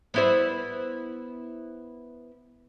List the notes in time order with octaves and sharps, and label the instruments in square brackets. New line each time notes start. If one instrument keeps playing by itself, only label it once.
[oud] B3 E4 C5